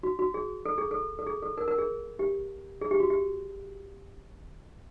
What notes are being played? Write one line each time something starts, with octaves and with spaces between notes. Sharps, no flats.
F#4
F#4
G#4
A4
G#4
A4
A4
G#4
A4
A#4
A#4
G#4
G4
G#4
G4
F#4
G4